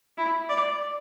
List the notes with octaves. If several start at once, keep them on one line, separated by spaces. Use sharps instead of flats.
E4
D5